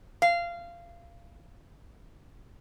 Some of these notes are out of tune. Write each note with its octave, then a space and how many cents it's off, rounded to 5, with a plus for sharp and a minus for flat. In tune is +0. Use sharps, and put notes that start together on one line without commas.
F5 -20